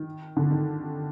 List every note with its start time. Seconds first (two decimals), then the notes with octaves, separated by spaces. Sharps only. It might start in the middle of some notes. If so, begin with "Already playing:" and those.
Already playing: D#3
0.37 D3
0.51 D#3